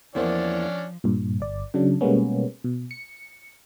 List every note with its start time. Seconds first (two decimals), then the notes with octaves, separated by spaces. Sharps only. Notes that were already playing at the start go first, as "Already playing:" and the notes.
0.15 E2 F3 A#3 C#4 D4 C5 D5
1.04 G2 A#2
1.40 G1 D5
1.74 C#3 F#3 D4
2.01 B2 G3 G#3 A#3 B3 C#4
2.64 B2
2.91 C#7